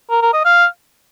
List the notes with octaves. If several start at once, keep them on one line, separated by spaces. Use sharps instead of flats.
A#4
A#4
D#5
F5